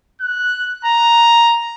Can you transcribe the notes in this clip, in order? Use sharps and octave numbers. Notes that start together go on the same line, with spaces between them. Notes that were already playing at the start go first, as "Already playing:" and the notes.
F#6
A#5